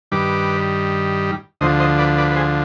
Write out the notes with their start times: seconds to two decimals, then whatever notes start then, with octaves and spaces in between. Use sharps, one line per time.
0.12 G2 D#3 G3 B4 D5
1.61 D2 D3 F3 C5 D#5
1.80 C5 D#5
1.98 B4 D5
2.18 B4 D5
2.31 B4
2.36 G#4 C5